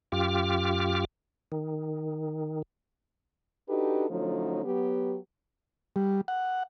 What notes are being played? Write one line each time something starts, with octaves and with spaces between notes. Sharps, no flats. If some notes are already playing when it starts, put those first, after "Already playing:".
F#2 F4 G4 D6 F6
D#3
D4 D#4 F#4 G4 A4 B4
D3 F3 F#3 A3 C#4 D#4
F#3 B3 G4
G3
F#5